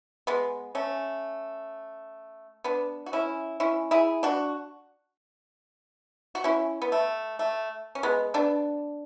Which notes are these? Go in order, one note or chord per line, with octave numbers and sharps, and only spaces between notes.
G#3 B3
A3 C#4
B3 D4
F#4
C#4 E4
C#4 E4
E4 G#4
D4 F#4
F#4
C#4 E4
B3
A3
A3
C#4
G#3 B3
B3 D4